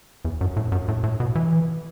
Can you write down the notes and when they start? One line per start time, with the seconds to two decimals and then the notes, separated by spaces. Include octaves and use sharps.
0.25 E2
0.41 F#2
0.56 A2
0.72 F#2
0.88 A2
1.03 A2
1.20 B2
1.35 E3